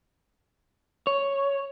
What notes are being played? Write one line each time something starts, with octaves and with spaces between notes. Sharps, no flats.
C#5